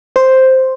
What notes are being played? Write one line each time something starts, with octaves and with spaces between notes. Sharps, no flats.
C5